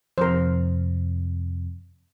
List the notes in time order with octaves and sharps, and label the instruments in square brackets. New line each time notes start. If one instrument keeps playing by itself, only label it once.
[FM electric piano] F2 C3 [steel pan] A#4 C5